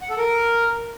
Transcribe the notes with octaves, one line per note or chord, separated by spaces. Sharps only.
F#5
A4
A#4